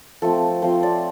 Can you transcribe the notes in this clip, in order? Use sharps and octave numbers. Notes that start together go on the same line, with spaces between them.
F3 A3 C4 A4
F3 A3 C4 C5
D5